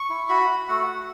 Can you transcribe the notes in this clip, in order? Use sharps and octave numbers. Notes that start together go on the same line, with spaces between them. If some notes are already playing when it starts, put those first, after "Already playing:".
Already playing: C#6
E4
F#4 B5
F#4
A3 F#5
F#4